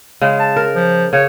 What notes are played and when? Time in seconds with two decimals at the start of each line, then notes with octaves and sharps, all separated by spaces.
0.21 C#3 G#3
0.39 A5
0.56 A#4
0.75 F3
1.13 C#3 C#5